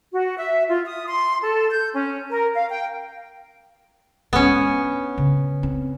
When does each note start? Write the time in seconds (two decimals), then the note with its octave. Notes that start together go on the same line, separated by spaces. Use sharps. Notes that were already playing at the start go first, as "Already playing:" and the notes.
0.13 F#4
0.37 E5
0.68 F4
0.85 D#6
1.06 C6
1.42 A4
1.70 G6
1.94 C#4
2.30 A#4
2.55 F5
2.69 G5
4.33 G#3 B3 C#4 D4
5.18 C#3
5.63 C4